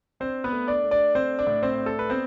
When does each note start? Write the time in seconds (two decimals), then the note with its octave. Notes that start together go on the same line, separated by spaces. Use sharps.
0.20 C4 D4 C5
0.44 B3 B4
0.52 A3
0.68 D4 D5
0.84 A3
0.91 D4 D5
1.15 C4 D4 C5
1.39 D4 D5
1.47 A2
1.63 C4 C5
1.78 D4
1.86 A4
1.99 B4
2.10 B3 C4 C5